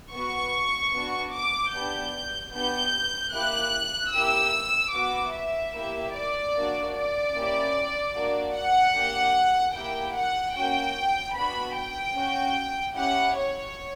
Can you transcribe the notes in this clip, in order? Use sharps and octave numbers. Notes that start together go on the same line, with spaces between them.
B3 F#4 C#6
B3 D4 F#4
D6
B3 D4 G4 G6
B3 D4 G4 G6
A#3 E4 G4 F#6
A#3 E4 G4 E6
B3 F#4 D6
E5
A#3 E4 G4
D5
A#3 D4 F#4
D5
A#3 C#4 E4 G4
A#3 D4 F#4
F#5
A#3 D4 G4
A#3 E4 G4 G5
F#5
A#3 C#4 F#4 G5
B3 D4 F#4 B5
G5
C#4 F#4
C#4 E4 G4 F#5
C#5